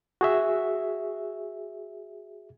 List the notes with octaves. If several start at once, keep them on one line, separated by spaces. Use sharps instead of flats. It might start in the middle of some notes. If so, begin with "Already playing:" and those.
F#4 G#4 E5